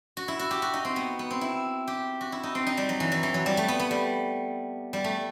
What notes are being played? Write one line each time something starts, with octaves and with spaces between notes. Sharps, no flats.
F#4
E4
F#4
G4
F#4
D#4
C4
B3
B3
C4
E4
G4
F#4
E4
D#4
C4
D#4
G3
F#3
E3
F#3
E3
F#3
G3
A3
B3
B3
G3
G3
A3